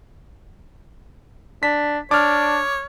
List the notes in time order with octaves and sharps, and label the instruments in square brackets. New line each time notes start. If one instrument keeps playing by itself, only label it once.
[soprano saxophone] D4 [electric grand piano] B6
[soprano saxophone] D4 [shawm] C#5 [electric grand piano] D6 F6